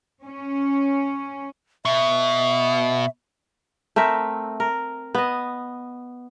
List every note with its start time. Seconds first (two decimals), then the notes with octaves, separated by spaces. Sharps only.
0.25 C#4
1.85 B2 E5
3.96 A3 C4 A#4 E5
4.60 A#4
5.15 B3 D#5